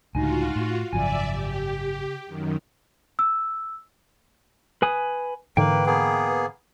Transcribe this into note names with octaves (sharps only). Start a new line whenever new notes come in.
C#2 A2 D3 D#4 F4 F#4 G#5
A2
G#1 F#2 C#3 F3 D5 E5 G#5
G4
F#2 D#3
E6
B4 G#5 D#6
G#2 D3 E3 A#3 B4 G5
A#3 B3 G#4